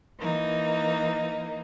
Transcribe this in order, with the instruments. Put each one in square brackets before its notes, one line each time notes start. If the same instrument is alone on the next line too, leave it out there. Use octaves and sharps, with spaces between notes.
[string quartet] E3 A#3 D#4